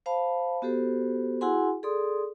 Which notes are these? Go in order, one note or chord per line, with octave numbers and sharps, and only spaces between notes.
C5 F5 A5 B5
B3 F#4 G4 A4 C5
E4 F#4 G#4 F#5 G#5 C6
G#4 A4 D5 C6 D#6